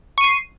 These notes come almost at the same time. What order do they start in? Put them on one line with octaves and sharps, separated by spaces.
C#6 D#7 C7